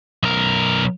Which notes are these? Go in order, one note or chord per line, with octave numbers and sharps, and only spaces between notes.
B1 A#4